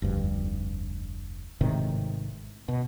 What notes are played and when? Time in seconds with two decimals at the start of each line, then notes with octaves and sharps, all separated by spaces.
0.02 F1 D2 G2
1.61 G#1 A2 C3 D#3
2.68 B2